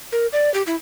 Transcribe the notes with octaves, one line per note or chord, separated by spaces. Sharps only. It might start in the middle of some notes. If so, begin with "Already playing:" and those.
A#4
D5
G4
E4